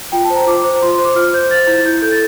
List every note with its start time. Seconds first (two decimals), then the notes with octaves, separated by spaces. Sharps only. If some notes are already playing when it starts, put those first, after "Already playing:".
0.12 F4 G5
0.25 A5
0.30 C5
0.35 A#5
0.47 F4 D6
0.64 C5
0.82 F4 C6
0.93 C6
0.99 C5
1.05 D6
1.15 F4 F6
1.33 C5 G6
1.50 C5 A6
1.67 E4
1.85 E4 G6
2.02 A4 G6
2.11 A6